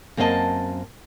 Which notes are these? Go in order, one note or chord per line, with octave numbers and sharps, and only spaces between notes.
F#2 A#3 C4 C#4 D#5 A5